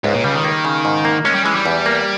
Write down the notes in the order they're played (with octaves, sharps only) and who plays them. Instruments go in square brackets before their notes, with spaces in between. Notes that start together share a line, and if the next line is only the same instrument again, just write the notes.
[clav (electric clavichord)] C#2 [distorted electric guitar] G#2
[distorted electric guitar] A#2
[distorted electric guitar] C#3 [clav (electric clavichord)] G3
[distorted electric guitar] D#3
[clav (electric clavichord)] A#3
C#3
G#2
A#3
[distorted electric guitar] G#3 [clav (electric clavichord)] C#4
[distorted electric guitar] G3
[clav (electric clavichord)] E3 [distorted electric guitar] G#3
[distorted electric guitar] G3
[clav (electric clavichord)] E2
A#3